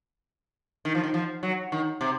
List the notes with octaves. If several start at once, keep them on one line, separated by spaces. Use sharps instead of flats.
D#3
F3
D#3
F3
F#3
D#3
C3